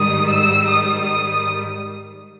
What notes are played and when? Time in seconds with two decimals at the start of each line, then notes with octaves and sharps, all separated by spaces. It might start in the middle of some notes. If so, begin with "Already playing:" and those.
Already playing: G#2 D#3 G3 D#6
0.28 E6
0.68 D#6
1.07 D#6